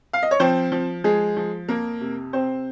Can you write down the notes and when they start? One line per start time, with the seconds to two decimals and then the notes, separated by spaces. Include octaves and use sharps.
0.13 F5
0.23 D#5
0.31 C#5
0.40 F3 C4 C5
0.72 F3
1.04 F3 G#3 G#4
1.36 F3
1.68 F2 A#3 A#4
2.01 C3
2.33 C3 C4 C5